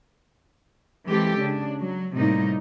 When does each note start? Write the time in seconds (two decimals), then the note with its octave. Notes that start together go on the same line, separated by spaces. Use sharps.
1.07 E3 G#3 C4 G4 A4
1.39 C#3 D4
1.79 F#3
2.15 A2 C3 G3 A#3 D#4